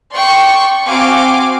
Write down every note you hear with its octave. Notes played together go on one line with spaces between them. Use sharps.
D5 G5 C6 C#6
C4 F#4 F5 G#5 C6 D6